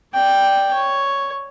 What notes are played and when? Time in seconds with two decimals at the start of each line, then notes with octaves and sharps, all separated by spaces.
0.14 D5 G5
0.74 C#5